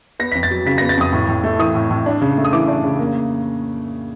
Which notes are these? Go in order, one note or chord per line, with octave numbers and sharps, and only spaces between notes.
B3 A#6
B6
F2
A6
F#3
C#3 B6
A#6
B3
A6
F2 D#6
A2
A2
A3
E3 D#6
A2
A2
D4
C#3
A3
D#6
E3 D6
D4
C#3
A#3